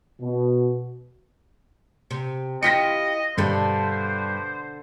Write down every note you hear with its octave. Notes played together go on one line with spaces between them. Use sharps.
B2
C3
E4 F4 G4 D#5 A#6 B6 C#7
G2 B2 D3 A4 C5